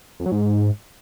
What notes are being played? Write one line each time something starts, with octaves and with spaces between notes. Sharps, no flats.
F2
F#3
G#2